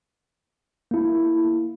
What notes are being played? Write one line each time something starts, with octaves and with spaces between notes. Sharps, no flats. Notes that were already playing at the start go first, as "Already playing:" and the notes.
A#3 E4